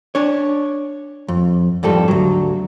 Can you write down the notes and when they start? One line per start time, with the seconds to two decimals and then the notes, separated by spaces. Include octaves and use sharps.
0.15 D4 C#5
1.28 F2
1.83 F2 G#2 G3 A4
2.08 D2 F#3